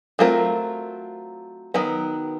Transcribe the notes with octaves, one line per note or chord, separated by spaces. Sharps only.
F#3 A3 C4 F4 A#4
D#3 F#3 B3